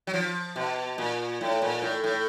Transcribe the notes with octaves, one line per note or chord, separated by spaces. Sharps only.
F#3
F3
B2
A#2
A2
A#2
A2
A2